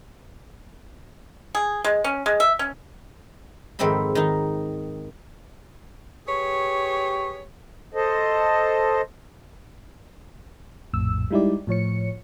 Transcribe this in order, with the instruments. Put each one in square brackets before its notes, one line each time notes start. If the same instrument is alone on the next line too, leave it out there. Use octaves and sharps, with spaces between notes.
[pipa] G#4
G#3
C#4
G#3
E5
C#4
[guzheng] F2 G#2 D#3 C4 E5 B5
D#3 D#4
[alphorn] G4 [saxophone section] G#4 B4 C#5 [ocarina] C#6
[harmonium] A4 C5 D#5
[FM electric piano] A#1 F2 A2 E6
G3 G#3 D#4 E4 G4 D5
A2 F3 C#5 C#7